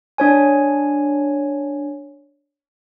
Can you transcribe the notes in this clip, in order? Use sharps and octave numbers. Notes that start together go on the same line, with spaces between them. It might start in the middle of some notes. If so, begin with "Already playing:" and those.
D4 C#5 G#5